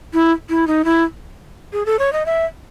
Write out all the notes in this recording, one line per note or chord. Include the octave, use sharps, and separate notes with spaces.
E4
E4
D#4
E4
G#4
A4
C#5
D#5
E5